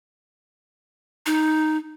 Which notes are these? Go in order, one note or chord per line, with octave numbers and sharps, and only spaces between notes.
D#4